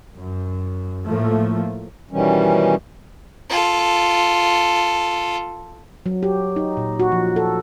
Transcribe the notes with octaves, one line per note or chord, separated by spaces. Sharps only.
F#2
A2 F3 A3 A#3
B2 D#3 E3 G3 C#4
F4 A4
F#3
G4
D#4
A#2
F#4
F3
A4